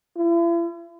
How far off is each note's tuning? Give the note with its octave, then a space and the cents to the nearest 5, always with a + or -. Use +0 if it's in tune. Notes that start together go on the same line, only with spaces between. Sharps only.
E4 +45